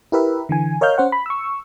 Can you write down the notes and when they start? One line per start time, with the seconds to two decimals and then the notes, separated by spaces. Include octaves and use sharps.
0.12 E4 G4 A#4 B4 E5
0.49 D3 E3 G#5
0.81 A#4 C#5 D#5 F5 F6 G6
0.98 C#4 C5 F#5
1.12 B5
1.26 C#6 E6